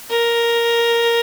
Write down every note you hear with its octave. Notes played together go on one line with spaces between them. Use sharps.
A#4